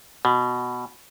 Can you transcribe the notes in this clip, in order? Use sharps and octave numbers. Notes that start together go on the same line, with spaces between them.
B2